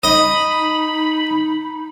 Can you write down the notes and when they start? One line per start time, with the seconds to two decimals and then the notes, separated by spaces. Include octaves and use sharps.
0.03 D#4 D#5 B5